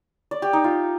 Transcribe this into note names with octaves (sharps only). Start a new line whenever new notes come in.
D5
G4
D#4
F4